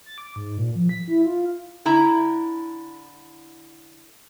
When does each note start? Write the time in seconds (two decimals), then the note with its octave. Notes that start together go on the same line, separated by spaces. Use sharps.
0.06 A6
0.18 D6
0.36 G#2
0.58 A#2
0.76 F3
0.89 B6
1.08 E4
1.25 F4
1.85 D3 E4 A#5